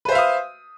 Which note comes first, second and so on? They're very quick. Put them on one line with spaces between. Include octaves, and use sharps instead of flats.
B4 C5 E5 F5 D#6